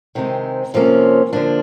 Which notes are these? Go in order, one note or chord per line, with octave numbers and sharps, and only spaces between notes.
C3 D#3 G#3 C4
C3 F3 A#3 C#4
D3 F3 A#3 D4